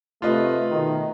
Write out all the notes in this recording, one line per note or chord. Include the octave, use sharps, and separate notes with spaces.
C3 A3 F4 B4 D#5
B2 D#3